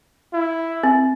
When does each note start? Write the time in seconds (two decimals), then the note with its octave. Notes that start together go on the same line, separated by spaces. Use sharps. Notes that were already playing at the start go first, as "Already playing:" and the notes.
0.33 E4
0.84 C4